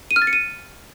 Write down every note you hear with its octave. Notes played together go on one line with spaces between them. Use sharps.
D#7
F6
A6
C#7
D#7